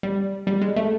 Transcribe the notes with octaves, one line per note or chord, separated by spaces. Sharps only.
G3
G3
G#3
A3